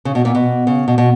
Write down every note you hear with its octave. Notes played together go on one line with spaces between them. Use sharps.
C#3
B2
A#2
B2
C#3
B2
B2